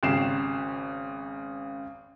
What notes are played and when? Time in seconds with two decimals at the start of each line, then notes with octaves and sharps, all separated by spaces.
0.03 G#1 C#3 G4 C7 E7